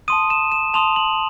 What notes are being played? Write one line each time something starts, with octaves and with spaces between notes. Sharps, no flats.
A5 C6 D#6 D#7
E7
E7
A5 C6 D#6 F7
F#7